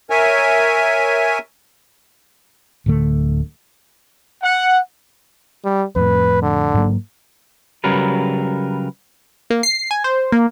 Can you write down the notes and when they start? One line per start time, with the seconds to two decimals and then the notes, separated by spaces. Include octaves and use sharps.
0.10 A#4 C#5 E5 G#5
2.86 D1 D2 D3 A3
4.44 F#5
5.65 G3
5.96 F2 A2 B4
6.42 D3
6.74 G#2 F#3 A#3
7.84 C#3 F#3 G3 A#4 B4
9.50 A#3
9.63 C7
9.91 G#5
10.04 C5
10.32 A#3